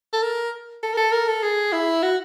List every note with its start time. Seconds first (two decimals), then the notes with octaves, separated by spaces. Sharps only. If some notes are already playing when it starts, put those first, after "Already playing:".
0.13 A4
0.23 A#4
0.83 A4
0.94 A#4
0.97 A4
1.12 A#4
1.28 A4
1.43 G#4
1.72 E4
2.03 F#4